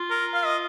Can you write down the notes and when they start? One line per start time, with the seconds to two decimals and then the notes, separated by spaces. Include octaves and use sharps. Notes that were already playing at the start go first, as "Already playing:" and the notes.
Already playing: F4
0.10 A#4
0.34 F5
0.46 D#5